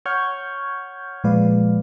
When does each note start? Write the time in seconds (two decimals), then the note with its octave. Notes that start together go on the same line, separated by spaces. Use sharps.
0.06 C#5 F#5 C#6 F6 G6 G#6
1.24 A#2 F3 G#3 B4 D5 F5